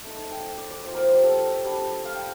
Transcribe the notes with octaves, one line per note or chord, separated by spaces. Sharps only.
A3 D#4
G5
D5
D5
F3 A#3 D#4 C5
A#4
F4
G4
A4
G3 D4 F4
F5
G5